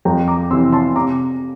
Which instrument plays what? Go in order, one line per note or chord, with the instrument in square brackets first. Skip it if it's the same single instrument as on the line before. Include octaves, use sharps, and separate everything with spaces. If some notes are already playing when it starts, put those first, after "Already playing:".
[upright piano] F2 G5 A#5
A#5 D6
C3 E3 C6 E6
A5 C6
C3 A#5 D6